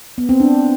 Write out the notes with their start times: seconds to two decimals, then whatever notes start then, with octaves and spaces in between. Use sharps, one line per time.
0.18 B3
0.29 C4
0.40 D4